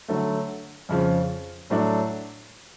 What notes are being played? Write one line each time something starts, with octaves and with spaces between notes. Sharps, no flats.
D3 F#3 A3
F2 C#3 F3
A2 F#3 A3 D4